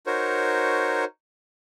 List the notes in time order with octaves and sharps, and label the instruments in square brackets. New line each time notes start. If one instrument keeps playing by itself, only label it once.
[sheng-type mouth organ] D#4 F#4 A#4 C5 C#5